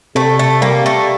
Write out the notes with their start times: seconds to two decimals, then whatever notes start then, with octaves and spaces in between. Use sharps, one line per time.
0.15 C3 A3
0.39 A3
0.62 G3 A#3
0.86 A3